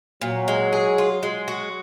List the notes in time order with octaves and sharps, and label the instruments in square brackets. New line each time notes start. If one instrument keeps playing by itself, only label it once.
[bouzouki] A#2 [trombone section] F#3
[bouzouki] G#3
G#4
F4
[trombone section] F#3 [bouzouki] G#3
[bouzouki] F#4